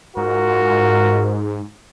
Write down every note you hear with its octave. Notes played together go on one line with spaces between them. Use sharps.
G#2 F4 F#4 A#4